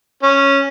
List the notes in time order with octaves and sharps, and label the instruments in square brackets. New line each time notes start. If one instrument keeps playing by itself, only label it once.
[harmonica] C#4